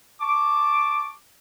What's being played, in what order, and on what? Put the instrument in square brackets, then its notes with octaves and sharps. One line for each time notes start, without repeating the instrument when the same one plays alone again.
[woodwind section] A5 C#6 D6